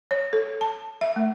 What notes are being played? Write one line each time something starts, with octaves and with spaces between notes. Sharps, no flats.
C#5
A4
A5
E5
A3